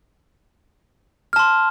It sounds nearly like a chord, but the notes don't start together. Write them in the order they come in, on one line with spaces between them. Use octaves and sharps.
F6 A5 C6